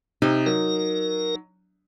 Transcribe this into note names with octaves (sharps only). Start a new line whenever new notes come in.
C3 D#4
F#3 A#4